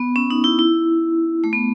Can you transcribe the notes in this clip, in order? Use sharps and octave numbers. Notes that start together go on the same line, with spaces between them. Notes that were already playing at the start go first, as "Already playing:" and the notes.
Already playing: B3
C#4
D#4
E4
E4
A3
B3